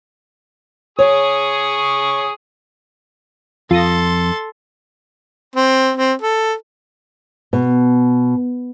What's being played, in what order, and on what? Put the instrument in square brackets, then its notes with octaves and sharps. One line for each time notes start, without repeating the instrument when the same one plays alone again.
[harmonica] G#4 C#6 D#6 [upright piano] C#5
[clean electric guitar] F2 [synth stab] F4 D#6 A#6 [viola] A4 C6
[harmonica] C4
C4
A4
[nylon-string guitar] B2